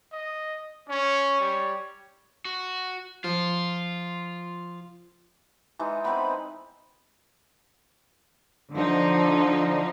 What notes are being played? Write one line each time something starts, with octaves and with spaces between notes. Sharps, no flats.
D#5
C#4 C#5
G3
F#4
F3 F4
E3 G#3 D#4
B3 C4 D#5 B5
D3 F3 D#4